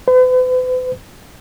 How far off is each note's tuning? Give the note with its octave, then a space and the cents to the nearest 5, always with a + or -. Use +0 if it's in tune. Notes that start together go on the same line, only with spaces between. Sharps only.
B4 +45